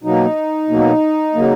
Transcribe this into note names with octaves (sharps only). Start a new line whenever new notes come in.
B2 F#3 A#3 D#4
B2 F#3 A#3
C#3 F#3 A#3